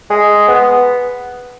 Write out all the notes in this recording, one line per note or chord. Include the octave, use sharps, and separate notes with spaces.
G#3
B3